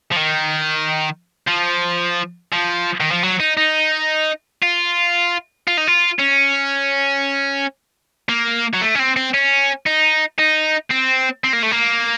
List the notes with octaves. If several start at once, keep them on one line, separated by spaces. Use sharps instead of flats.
F3
D#3
F3
F3
D#3
F3
F#3
D#4
D#4
F4
F4
D#4
F4
C#4
A#3
F#3
A3
C#4
C4
C4
C#4
D#4
D#4
C4
C4
A#3
A3
A#3